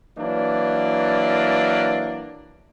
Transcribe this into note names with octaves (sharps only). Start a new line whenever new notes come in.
E3 F#3 A#3 D4